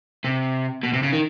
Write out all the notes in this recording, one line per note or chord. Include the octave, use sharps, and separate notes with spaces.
C3
B2
C3
C#3
D#3